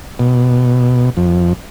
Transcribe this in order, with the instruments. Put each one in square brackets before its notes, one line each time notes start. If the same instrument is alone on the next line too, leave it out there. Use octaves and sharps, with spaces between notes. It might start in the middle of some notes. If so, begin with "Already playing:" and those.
[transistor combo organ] B2
F2